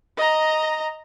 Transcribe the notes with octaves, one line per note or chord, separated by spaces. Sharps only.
D#5 A#5